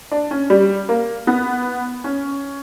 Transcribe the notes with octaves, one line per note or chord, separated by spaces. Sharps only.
D4
C#4
G3
A#3
B3
C#4